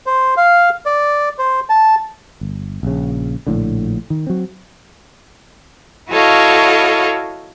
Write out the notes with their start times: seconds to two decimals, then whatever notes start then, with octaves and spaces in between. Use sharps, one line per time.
0.06 C5
0.37 F5
0.86 D5
1.39 C5
1.70 A5
2.41 G1
2.83 A#1 C#3
3.47 A#1 A2 D3
4.10 D#3
4.27 F#3 C4
6.10 E4 F#4 A4 C#5 D#5 F5